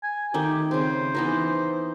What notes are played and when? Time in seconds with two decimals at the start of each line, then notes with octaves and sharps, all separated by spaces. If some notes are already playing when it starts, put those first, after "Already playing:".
0.03 G#5
0.34 D#3 A3 G4
0.71 C#3 C4 C5
1.15 E3 B3 D#4